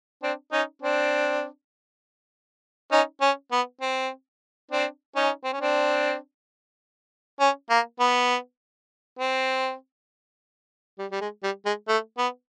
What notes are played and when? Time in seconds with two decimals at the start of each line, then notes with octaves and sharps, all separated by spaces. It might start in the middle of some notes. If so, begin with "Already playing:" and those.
0.23 C4 D4
0.52 C#4 D#4
0.82 C4 D4
2.92 C#4 D#4
3.21 C#4
3.52 B3
3.81 C4
4.71 C4 D4
5.16 C#4 D#4
5.44 C4
5.53 C#4
5.60 C4 D4
7.40 C#4
7.70 A#3
8.00 B3
9.19 C4
10.99 G3
11.11 G3
11.21 G#3
11.43 G3
11.65 G#3
11.88 A3
12.18 B3